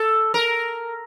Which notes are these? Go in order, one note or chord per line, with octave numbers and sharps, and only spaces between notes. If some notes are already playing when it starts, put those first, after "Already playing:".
Already playing: A4
A#4